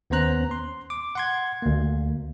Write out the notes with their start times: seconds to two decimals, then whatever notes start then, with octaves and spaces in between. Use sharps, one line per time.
0.10 D#2 B3 C#4 C5 A#5 F#6
0.51 C6
0.90 D6
1.15 F#5 C6 G#6
1.62 D2 A#3